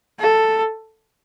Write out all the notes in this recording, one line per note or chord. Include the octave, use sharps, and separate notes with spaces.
A4